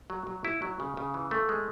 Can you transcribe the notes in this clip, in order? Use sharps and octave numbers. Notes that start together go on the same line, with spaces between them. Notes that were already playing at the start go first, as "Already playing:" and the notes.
F#3
F#3
E4
F#3
C#3
C#3
E3
A3
G#3